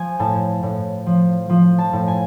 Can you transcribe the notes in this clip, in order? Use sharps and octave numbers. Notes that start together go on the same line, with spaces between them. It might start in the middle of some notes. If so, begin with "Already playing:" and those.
Already playing: F3 G#5
A2 A5
A2
F3
F3
A5
A2
G#5